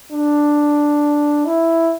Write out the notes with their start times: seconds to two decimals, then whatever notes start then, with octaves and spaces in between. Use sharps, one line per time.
0.12 D4
1.45 E4